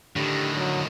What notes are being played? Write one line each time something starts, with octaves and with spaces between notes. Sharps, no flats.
A2 D3 D#3 G4
F#3